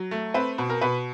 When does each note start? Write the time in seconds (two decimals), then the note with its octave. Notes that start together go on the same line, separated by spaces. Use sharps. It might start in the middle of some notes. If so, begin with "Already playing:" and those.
Already playing: F#3
0.11 A3
0.34 C4 B4
0.58 B2
0.70 A#4
0.81 B2 B4